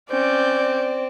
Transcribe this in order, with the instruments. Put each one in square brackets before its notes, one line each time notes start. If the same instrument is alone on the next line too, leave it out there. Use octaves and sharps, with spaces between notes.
[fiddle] C4 [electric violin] C#4 G6 [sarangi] D5